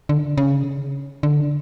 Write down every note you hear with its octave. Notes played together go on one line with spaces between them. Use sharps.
D3
C#3
D3